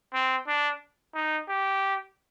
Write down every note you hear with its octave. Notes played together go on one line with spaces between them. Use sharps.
C4
D4
D#4
G4